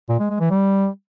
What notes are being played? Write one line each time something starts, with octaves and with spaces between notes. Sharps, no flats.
A#2
G#3
G#3
E3
G3